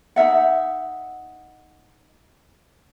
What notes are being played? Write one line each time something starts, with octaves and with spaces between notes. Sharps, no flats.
D#4 F4 E5 F#5